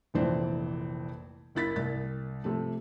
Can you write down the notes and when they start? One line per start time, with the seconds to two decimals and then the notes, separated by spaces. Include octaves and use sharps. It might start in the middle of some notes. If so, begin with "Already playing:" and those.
0.14 F1 A#1 F2 E3 C5 D5
1.55 F#1 E4 A6 B6
1.76 C2 A6
2.44 C3 F3 A3